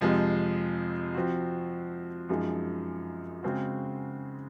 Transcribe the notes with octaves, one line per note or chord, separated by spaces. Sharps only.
F2 C3 F3 G#3
F3 C4 F#4
F#2 F3 G#3 D#4 G#4
C#3 G#3 C4 F#4